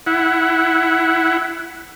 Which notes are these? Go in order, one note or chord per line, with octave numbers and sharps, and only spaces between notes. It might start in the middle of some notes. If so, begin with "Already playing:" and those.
E4 F#5